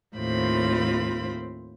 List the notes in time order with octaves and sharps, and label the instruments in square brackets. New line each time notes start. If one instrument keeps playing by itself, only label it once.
[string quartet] D#2 A2 C4 F4 C5 B5